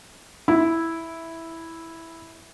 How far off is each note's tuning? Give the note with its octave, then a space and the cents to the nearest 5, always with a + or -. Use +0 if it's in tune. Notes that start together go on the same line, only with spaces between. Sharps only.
E4 -5